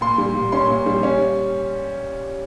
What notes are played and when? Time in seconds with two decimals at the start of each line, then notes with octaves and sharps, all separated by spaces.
0.01 A#2 C6
0.18 G3
0.35 A#2
0.52 C#4 C6
0.70 A#2
0.86 G3
1.03 C#4